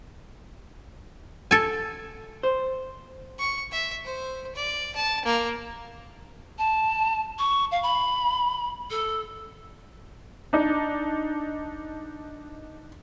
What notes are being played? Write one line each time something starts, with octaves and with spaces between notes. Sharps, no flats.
A4 G#5
C5
C#6
E5
C5
D5
A5
A#3
A5
C#6
F5
B5
A4
D4 D#4